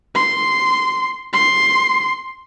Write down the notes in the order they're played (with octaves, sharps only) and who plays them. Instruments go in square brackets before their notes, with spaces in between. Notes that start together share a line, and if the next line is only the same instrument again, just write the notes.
[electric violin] C6
C6